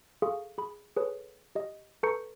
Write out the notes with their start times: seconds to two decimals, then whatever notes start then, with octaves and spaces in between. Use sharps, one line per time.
0.22 G#4 A4 F5 C6 C#6
0.58 G#4 B5
0.97 G#4 A4 B4 C#5
1.55 G4 D#5
2.03 A4 B4 A#5 C#6 G6 C#7